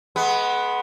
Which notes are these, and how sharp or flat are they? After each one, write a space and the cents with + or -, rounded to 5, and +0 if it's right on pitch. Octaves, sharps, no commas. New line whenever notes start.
G#3 +35 B3 +0